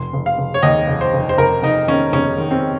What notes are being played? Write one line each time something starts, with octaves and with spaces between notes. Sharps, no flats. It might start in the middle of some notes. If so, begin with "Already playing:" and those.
Already playing: F1 C6
F1
F5
F1
C#5
D#2 D#5
F1
C5
F1
C5
F1 A#4
F1 D#4
D#3 C#4
F1 C#4
D#3
C4